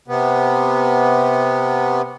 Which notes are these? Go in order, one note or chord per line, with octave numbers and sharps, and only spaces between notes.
C3 B3